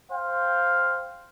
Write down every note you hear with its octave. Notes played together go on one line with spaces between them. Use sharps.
C5 F5 G5